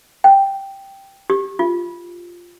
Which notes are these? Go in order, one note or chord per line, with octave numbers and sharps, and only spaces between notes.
G5
G4
F4